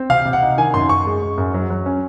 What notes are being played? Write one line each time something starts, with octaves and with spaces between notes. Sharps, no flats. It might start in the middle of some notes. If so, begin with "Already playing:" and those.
Already playing: C4
C3 F5
C3
F#5
D#4
D#3 G#5
F#2 C6
F#2 C#6
G#3
G#3
F#2
F#3
F#3
C#4